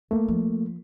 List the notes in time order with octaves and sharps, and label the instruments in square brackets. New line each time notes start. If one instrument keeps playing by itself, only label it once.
[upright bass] D2 [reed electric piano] A3 A#3
[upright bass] F3